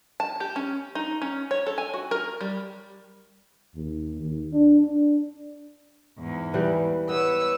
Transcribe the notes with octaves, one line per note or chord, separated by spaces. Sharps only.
A5
G4
C#4
D#4
C#4
C#5
A4
G#5
F#4
A#4
G3
D#2
D#2
D4
D4
E2 G#2
E3 G3 G4
B3 B4 C#5 E6